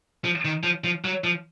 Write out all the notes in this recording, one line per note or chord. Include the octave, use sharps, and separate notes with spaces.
F3
D#3
F3
F3
F#3
F3